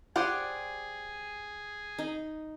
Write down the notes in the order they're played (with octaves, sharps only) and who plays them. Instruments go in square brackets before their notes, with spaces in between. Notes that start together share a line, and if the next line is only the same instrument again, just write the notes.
[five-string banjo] G4 C5 F#5 [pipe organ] G#4 [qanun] D5
[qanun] D#4